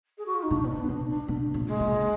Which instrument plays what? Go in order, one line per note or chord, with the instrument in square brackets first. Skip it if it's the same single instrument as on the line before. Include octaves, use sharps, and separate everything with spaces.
[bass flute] G#4
F#4
F4
D#4
[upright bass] B2 [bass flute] D4
[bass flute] B3
D4
B3
[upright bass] B2 [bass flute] D4
[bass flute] D4
[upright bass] B2
A#2
[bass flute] G#3
[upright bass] B2